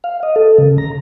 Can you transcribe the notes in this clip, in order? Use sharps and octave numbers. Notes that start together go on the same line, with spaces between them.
F5
D#5
A4
C#3
A#5